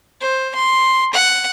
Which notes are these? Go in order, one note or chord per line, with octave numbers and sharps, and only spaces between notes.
C5
C6
F#5